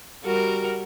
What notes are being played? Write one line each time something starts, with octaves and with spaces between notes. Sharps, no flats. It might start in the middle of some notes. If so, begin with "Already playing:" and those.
G3 F#4 A#4